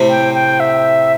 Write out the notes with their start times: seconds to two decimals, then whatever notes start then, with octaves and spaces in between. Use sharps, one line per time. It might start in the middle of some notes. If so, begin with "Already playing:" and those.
Already playing: A2 C3
0.10 G5
0.34 G5
0.60 E5